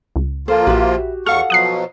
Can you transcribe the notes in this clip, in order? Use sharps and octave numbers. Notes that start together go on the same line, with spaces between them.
C#2
F3 A#3 F4 A4 C5
A#1 F#4 G4 B4 E5
E2 A4 F5 F#5 C#6 F6
B2 F3 F#3 D#6 F#6 C7